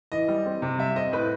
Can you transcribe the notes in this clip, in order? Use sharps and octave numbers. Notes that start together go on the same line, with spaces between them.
E3 D#5
G3
C4
C3
G3 E5
C4 D#5
A2 B4